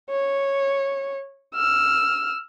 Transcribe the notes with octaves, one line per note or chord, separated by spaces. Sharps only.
C#5
E6 F6